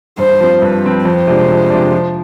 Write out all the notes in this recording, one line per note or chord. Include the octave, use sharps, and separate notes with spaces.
G2 C5
F3 C4
G2 B4
F3 C4
F2 C5
C3 F3 G#3 D4
F2
C3 F3 G#3 D4
F3